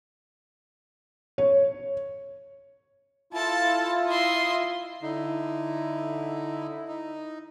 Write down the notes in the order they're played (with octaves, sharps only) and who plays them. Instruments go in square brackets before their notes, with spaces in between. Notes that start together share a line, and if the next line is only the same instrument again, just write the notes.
[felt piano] C#5
[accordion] E4 F4 [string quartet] A4 A5
[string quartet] D#5 E5 C6
[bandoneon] D3 D#4 [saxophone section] E4
[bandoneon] D#4